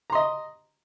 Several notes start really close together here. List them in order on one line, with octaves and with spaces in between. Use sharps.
A#5 C6 D#5